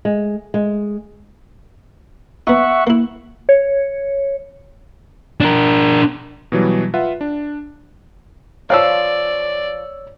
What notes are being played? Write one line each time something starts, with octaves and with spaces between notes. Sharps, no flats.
G#3
G#3
B3 D#4 E5 F#5 C#6
A#3 E4
C#5
D4 A#4
B2 E3 F#3 G3
F4 B4 E5 F#5
D4
F3 C4 C#5 D5 F5 E6